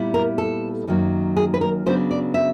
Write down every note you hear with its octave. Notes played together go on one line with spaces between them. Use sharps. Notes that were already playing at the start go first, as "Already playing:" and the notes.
Already playing: A#2 G3 B3 E4
A#4
A4
F#2 D#3 F#3 A#3
G#4
B4
A#4
C#3 F#3 B3 D4 C5
D5
E5